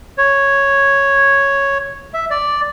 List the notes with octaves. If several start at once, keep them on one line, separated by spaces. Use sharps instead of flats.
C#5
E5
D5